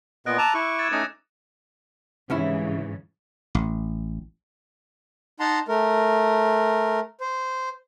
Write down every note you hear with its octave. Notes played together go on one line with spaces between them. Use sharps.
A#2 B3 D#5 F#6 D7
A5 A#5 D6 E6 D#7
E4 C#6
G#6 A6 E7
A3 C#4 D#4 D#6 A#6 C#7
C2 G#2 C#3 E3 C#4 E4
A1
D#4 F#5 A5 A#5 C6
A3 A#4
C5